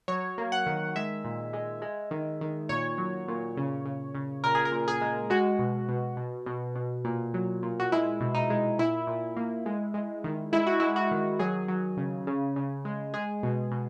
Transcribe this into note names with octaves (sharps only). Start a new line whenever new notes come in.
F#3 C#5
A#3
F#5
D#3
G#3 E5
A#2
G#3
G#3
D#3
D#3
A#2 C#5
F#3
A#2
C#3
C#3
C#3
A#2 A#4
G#4
A#4
A#2
G#4
G#3
G#3 F#4
B2
B2
B2
B2
B2
A#2
F#3
A#2
F#4
G#3 E4
B2
D#4
G#3
A#2 E4
A#2
A#3
G#3
G#3
D#3
G#3 E4
F#4
G#3 E4
F#4
D#3
F#3 G#4
F#3
C#3
C#3
C#3
G#3
G#3 G#4
B2
B2